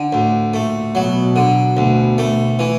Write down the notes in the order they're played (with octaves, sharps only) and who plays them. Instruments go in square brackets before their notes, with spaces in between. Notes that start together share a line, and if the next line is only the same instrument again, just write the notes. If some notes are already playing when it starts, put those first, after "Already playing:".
Already playing: [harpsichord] D3
[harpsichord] D2 [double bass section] A2
[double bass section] A#2 [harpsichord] A3
[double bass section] B2 [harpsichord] F#3
[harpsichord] D3
[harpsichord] D2 [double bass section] B2
[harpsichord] A3
E3